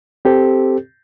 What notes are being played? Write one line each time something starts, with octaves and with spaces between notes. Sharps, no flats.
C4 G4 A4 C5